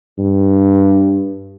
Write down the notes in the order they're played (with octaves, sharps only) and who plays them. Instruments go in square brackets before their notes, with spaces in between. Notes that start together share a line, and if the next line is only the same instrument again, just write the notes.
[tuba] G2